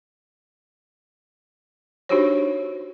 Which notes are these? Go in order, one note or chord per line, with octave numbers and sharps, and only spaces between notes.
D4 D#4 F#4 G4 C5 C#5